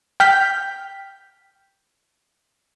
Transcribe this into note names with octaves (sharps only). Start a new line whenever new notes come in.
G5 F6 G6 B6